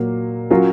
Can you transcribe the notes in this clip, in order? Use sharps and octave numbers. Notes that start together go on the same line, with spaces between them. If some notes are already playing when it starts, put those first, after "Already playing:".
Already playing: A#2 F#3 A#3
F#3 C#4 F4 A#4